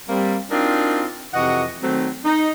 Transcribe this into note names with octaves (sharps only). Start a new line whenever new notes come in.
G3 A#3 C4
C4 D4 D#4 F4 F#4 A#4
F2 C3 E3 F#4 D#5 F#5
D#3 F#3 A3 C4
D#4